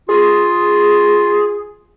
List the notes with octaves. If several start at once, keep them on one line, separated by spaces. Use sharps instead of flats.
F4 G#4